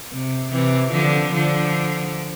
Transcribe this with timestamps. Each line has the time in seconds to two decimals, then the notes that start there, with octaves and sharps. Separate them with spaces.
0.11 C3
0.51 C3 E3
0.92 D3 F3
1.32 D3 F3